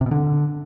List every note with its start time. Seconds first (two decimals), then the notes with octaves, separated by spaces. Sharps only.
0.01 C3
0.06 B2
0.11 D3